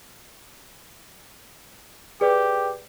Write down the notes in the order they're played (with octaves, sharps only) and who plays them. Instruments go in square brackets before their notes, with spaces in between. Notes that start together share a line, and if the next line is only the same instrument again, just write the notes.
[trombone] G4 [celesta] G#4 B4 D5